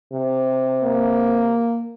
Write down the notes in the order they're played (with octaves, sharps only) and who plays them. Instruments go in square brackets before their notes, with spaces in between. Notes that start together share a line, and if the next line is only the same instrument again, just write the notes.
[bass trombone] C3
[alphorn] A#3